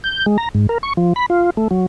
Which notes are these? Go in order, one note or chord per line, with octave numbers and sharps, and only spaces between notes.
G6
G#3
A#5
G#2
A#4
C#6
F3
B5
F4
A3
F#3